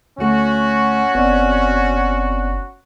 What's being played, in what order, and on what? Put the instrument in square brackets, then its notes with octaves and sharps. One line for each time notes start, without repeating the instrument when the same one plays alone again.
[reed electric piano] D2 A3 [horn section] C#4 F#4
[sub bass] F#1 [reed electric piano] B3 C4 D5